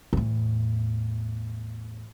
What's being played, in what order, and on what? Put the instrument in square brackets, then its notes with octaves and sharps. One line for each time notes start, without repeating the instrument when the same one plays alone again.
[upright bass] E2 A2